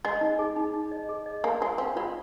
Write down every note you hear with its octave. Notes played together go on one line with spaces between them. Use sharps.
G#3 D#5
D#4
G#4
D#4
D#4
D#5
G#4
D#5
A#3 G#5
G#3 F4
C4 F5
G#3 F4